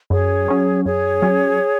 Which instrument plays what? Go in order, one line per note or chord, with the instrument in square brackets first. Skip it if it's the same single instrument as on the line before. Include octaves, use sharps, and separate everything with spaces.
[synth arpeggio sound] F#2 [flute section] G#4 C#5
[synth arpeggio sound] F#3 C#4
[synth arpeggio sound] F#2 [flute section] G#4 C#5
[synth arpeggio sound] F#3 C#4